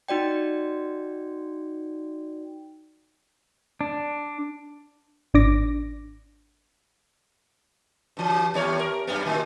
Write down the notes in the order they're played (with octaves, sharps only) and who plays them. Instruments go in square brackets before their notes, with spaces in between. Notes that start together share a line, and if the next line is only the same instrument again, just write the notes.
[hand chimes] D#4 F#4 D5 G5
[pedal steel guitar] D4
[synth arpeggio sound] G#1 D4 D6 A#6
[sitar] G2 E3
D#2 G3 C#5
A#4
F#2 G3 B3
A2 D#3